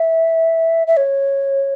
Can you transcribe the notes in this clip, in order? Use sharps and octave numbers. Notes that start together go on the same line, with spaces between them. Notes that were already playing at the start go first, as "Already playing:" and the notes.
Already playing: E5
E5
C#5